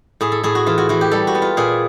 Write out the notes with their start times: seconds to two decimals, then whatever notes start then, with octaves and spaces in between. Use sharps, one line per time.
0.21 A2 G#4
0.32 A4
0.44 A2 G#4
0.55 F#4
0.66 E3 F4
0.78 F#4
0.89 E3 F#4
1.01 G4
1.11 G3 A4
1.27 F#4
1.35 B3
1.42 F4
1.57 A#2 G#4